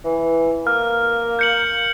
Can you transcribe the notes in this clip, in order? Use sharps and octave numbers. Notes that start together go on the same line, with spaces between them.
E3
A#3 F6
G6 C#7 F#7